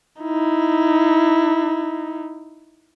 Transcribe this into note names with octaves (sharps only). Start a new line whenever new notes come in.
D#4 E4